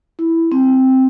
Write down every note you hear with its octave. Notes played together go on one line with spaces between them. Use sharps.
E4
C4